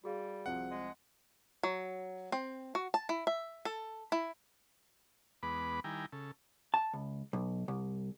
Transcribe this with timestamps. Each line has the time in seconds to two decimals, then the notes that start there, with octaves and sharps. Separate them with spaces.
0.04 G3 F#4 G#4 F5
0.46 C2 F3 C4 F#5
0.70 G#3
1.63 F#3
2.32 C4
2.75 F#4
2.94 A5
3.09 E4
3.27 E5
3.65 A4
4.12 E4
5.43 E2 G#3 B3 B4 B5 D6
5.84 D#3 G3 E4 G5 G#5 A#5
6.13 C#3 A4
6.74 A5
6.94 C#2
7.33 B1
7.68 C2